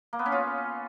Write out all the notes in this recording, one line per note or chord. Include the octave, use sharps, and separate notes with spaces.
A#3
B3
C#4
F4